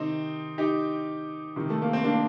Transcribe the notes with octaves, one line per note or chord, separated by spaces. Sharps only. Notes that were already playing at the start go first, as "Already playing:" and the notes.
Already playing: C3 D#3 C4 D#4
D#4 G4
C3 D#3
A3
A#3
C4
A#3 D4